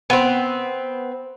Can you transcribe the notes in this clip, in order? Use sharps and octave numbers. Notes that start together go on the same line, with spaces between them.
B3 C4